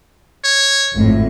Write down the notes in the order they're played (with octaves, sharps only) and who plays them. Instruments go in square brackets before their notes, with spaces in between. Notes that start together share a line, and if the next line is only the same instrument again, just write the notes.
[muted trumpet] C#5
[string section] G#1 F2 A2